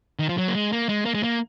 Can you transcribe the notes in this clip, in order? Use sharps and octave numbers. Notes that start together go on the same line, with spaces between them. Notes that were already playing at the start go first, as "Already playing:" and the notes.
D#3
F3
F#3
A#3
G#3
A#3
G#3
A#3
G#3
A#3